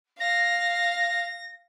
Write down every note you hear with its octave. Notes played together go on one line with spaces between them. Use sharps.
F5 A#6